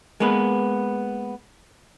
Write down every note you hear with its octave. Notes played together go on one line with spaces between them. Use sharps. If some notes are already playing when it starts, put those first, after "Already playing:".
G#3 A#3 B3 B4